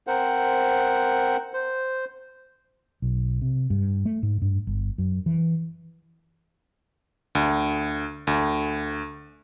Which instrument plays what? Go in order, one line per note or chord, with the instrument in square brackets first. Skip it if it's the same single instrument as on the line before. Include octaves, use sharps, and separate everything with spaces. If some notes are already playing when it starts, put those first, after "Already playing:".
[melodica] C4 A#4 C5 F#5
C5
[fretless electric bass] B1
C3
G2
A3
G#2
G2
G1
F#2
E3
[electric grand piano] D2
D2